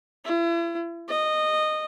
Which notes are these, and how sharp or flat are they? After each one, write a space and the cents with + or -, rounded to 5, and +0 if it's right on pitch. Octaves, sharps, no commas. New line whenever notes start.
E4 +40
D#5 -15